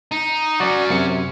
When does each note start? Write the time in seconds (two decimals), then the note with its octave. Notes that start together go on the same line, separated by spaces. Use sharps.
0.11 D#4
0.60 F#3 C#4 F#4 D5
0.90 F#2 C3 C#7